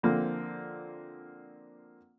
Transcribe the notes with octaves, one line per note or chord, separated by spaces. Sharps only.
D3 F3 A#3 C4